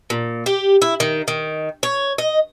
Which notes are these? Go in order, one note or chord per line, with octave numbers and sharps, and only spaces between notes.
A#2
G4
E4
D#3
D#3
C#5
D#5